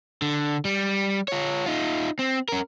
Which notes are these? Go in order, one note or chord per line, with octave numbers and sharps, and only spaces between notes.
D3
G3
F4 C#5
D#4 F4
C4
C#4 A#4